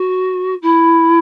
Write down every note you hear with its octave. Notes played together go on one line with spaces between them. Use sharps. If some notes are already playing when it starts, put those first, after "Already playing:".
Already playing: F#4
E4